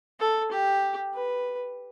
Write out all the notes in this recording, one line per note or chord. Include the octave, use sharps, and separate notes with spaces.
A4
G4
B4